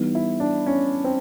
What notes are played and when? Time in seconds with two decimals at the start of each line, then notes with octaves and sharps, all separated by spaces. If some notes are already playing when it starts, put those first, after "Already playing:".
Already playing: E3 G3 B3 D#4
0.15 E4
0.40 D4
0.66 C#4
1.04 C4